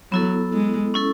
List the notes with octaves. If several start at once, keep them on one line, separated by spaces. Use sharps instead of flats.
F#3 B3 E4 A4
G#3
C#4 E4 A4